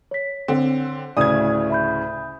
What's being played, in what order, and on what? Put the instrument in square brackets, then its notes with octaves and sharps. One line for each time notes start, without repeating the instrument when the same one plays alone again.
[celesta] C#5 B6
[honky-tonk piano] D3 C4
[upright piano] D2 A2 C#3 [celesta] D5 [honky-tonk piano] D#6 G#6
[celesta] E5 B5 G6